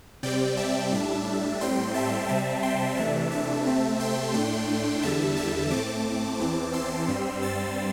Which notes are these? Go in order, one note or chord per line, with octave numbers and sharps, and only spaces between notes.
C3 G3 C4 D5 G5
E5 A5
A2 G3 D4
A2 G3 C4 G5 C6
E5 A5
C3 G3 C4 E5 A5
G5 C6
C3 E3 A3 D4 E5 A5
E5 A5
C3 A3 C4
G5 C6
A2 A3 D4
E2 D3 G3 E5 A5
E5 A5
A2 A3 C4 A5 D6
E2 E3 C4
C6 E6
G2 G3 C4
E6 A6